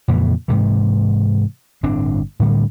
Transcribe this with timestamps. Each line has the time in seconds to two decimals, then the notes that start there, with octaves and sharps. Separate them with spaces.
0.08 F2 A#2 C#3 E3
0.48 G#2 C3 E3
1.83 G1 A2 C4 D4
2.40 A2 D3 G3